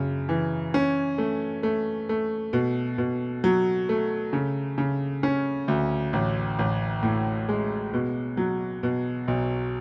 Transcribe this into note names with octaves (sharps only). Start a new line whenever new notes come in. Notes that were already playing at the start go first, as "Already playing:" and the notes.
Already playing: F#2 C#3
E3
C#4
A3
A3
A3
B2
B2
F#3
A3
C#3
C#3
C#4
D2
A1
A1
A2
G#3
B2
F#3
B2
B1